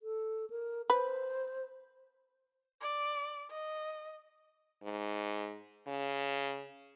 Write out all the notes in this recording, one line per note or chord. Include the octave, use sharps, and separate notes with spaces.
A4
A#4
B4 C5
D5
D#5
G#2
C#3